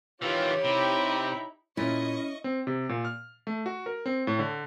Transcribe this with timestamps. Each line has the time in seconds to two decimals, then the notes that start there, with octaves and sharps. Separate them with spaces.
0.22 D#3 E3 F4 G4 C#5
0.64 C3 D#4 E4 G5
1.77 A#2 C#4 E4 D#5 C#6
2.44 C4
2.67 C3
2.89 A#2
3.05 F6
3.47 A3
3.66 F#4
3.86 A#4
4.06 C4
4.27 A2
4.39 D3